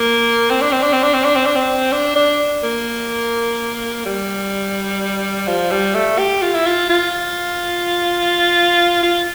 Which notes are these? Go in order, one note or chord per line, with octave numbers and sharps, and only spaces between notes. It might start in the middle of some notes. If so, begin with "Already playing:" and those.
Already playing: A#3
C4
D4
C4
D4
C4
D4
C4
D4
C4
D4
C4
D4
D4
A#3
G3
F3
G3
A3
G4
F4
E4
F4
F4
F4